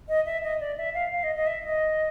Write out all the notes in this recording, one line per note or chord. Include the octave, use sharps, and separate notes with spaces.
D#5
E5
D#5
D5
E5
F5
F5
D#5
D#5
E5
D#5